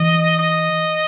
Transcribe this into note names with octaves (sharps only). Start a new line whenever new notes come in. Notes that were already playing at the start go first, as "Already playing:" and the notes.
Already playing: E3 D#5
D#5